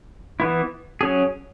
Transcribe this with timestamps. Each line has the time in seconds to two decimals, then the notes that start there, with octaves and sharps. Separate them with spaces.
0.40 E3 B3 E4
1.01 F#3 C#4 G#4